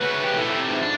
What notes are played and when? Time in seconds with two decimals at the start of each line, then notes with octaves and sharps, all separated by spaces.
0.01 C#3 A3 F#4 B4
0.23 F2 G4
0.37 B2 A3 E4 A4
0.50 C3 A3
0.69 G#2 F3
0.83 D4